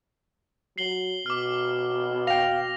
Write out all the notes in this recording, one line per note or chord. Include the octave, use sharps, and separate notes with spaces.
F#3 C7 F#7 G7
B2 D6 F6
F5 G5 A#6 F7